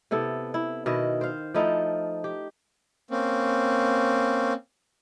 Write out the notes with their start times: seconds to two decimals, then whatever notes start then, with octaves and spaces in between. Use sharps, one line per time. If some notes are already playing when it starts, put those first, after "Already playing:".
0.11 C3 B3 E4 A4
0.54 E4
0.86 B2 D#3 E4 D#5
1.21 C5 F5
1.54 F3 A3 D#4 E4
2.24 G4
3.11 A#3 C4 C#4